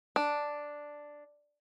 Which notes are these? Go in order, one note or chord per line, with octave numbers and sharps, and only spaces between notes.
D4